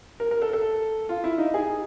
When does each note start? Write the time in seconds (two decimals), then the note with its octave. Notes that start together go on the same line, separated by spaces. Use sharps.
0.20 A#4
0.31 A#4
0.42 A4
0.53 A4
1.09 F4
1.24 E4
1.38 D#4
1.54 G#4